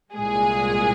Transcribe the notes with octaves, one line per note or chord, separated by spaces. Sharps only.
C2 A#2 G#3 G#4